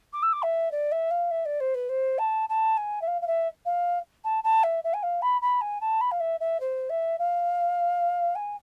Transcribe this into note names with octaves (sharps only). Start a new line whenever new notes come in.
D6
E6
D6
E5
D5
E5
F5
E5
D5
C5
B4
C5
A5
A5
G#5
E5
F5
F5
E5
F5
A5
A5
E5
E5
G#5
F5
B5
B5
G#5
A5
B5
F5
E5
E5
C5
E5
F5
G#5